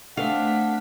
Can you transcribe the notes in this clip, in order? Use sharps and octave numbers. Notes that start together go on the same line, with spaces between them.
A3 C4 D4 F5 F#5 B6